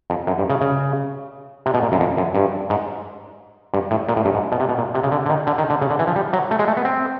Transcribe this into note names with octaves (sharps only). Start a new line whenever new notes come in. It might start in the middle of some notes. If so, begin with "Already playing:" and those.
F2
F#2
G2
C#3
C#3
C3
B2
A#2
F#2
F2
F#2
G2
G#2
G2
A2
A#2
A2
G2
G#2
B2
C3
B2
A#2
C3
C#3
D3
D3
D#3
D3
D#3
D3
C#3
D3
E3
F3
G3
F#3
A3
G#3
A3
B3
C4